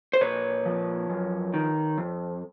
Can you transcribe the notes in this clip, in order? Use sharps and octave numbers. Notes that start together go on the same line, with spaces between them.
C5
A#2 B4 C#5
F3
F#2
D#3
F2